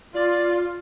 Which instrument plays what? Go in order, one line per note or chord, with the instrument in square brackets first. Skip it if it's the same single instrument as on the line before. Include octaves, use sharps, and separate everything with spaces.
[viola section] F4 [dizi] D5